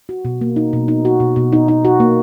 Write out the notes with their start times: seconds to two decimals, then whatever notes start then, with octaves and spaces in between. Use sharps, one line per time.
0.09 F#4
0.25 B2
0.41 A#3
0.56 D#4
0.73 B2
0.88 D#4
1.05 F#4
1.20 B2
1.36 B2
1.53 D#4
1.68 D#4
1.85 F#4
2.00 A#3